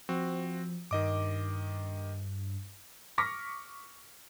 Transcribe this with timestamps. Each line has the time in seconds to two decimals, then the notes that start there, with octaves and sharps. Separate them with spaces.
0.09 F3 C4 F#4
0.91 G2 D#3 D#5 D6
3.18 C#6 D6 F6 A#6 B6